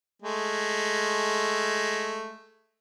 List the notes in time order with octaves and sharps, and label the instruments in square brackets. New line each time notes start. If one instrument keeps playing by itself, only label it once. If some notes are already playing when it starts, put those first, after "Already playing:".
[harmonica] G#3 A3